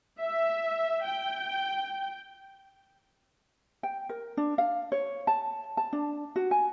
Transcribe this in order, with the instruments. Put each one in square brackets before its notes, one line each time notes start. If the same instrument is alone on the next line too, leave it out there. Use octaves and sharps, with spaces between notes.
[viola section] E5
G5
[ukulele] G5
A#4
D4
F5
C#5
A5
A5
D4
F#4
G#5